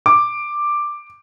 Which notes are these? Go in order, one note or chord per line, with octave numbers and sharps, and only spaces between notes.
D6